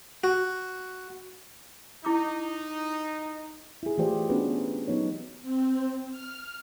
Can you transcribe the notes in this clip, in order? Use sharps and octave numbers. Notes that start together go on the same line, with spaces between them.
F#4
D#4 E4 D6
E4 G#4
E3 A3 F4 G4 C5 D5
B3 C#4 D4 F#4 G#4 B4
F#3 B3 D#4 C#5
C4
F6